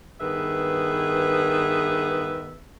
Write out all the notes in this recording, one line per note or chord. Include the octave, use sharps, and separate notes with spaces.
G2 D#3 B3 G#4 B4 E5